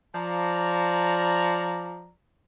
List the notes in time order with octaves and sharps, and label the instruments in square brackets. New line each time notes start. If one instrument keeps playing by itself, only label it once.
[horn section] F3 D5 A#5